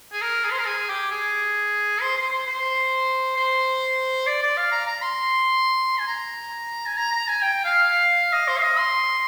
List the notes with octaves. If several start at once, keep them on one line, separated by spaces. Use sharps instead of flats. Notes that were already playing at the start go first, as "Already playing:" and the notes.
G#4
A#4
G#4
C5
A#4
G#4
G4
G#4
C5
C5
C5
C5
C5
D5
D5
F5
A#5
A#5
C6
G#5
A#5
G#5
A#5
A#5
G#5
G5
F5
D#5
C5
F5
D#5
C6